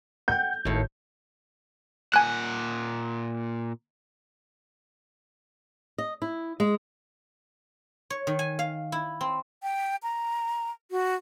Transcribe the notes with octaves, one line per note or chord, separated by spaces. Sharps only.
F#5 G5 G6
G#1 D#2 A2
A#2 F#5 G#5 F#6
D#5
E4
G#3
C#5
D#3
G#5
F5
E4
C4
G5
A#5
F#4